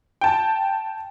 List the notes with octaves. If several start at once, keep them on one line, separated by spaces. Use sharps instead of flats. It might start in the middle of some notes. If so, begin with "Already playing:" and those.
G5 A5